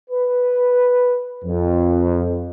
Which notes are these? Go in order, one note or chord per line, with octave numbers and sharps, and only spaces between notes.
B4
F2